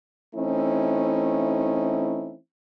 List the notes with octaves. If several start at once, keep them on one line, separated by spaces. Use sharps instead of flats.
E3 A3 C4 C#4 D#4 E4